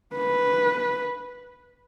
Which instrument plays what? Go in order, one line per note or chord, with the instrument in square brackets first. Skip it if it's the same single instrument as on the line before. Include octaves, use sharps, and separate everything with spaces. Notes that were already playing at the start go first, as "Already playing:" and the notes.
[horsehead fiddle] B4